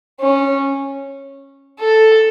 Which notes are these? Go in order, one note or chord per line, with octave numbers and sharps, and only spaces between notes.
C#4
A4